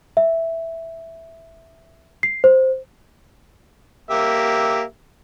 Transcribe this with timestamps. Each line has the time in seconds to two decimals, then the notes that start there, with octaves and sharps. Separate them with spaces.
0.17 E5
2.23 C7
2.44 C5
4.11 A#3 G4 E5